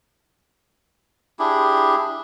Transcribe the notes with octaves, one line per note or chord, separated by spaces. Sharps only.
D4 E4 G4 G#4